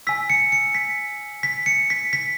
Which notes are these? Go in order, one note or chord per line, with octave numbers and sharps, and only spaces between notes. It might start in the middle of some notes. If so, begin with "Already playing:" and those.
G#5 E6 B6
C#7
C#7
B6
B6
C#7
B6
B6